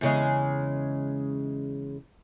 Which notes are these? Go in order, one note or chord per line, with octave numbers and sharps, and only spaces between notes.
E2 C#3 G#3